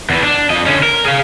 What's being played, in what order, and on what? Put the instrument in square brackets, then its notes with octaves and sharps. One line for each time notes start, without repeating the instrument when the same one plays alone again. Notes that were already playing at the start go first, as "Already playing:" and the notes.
[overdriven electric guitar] E2 E3
D4
F2 D#5
D3 C#4
A#4
G#4 F5